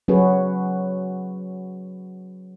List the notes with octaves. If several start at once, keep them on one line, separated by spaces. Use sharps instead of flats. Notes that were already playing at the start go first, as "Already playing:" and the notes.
F#3 C#4 F#4 G#4 B4 C#5